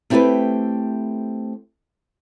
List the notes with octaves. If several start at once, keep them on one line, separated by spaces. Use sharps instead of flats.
A3 C4 E4 G4 A4 B4